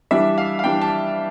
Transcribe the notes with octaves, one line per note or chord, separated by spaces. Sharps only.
E3 G3 D4 E5
F5
F5
E3 G3 D4 G5
A5